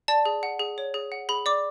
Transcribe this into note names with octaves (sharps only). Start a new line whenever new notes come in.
D5 A5
G#4
F#5
G#4
C#5
G#4
F#5
G#4 B5
D5 D6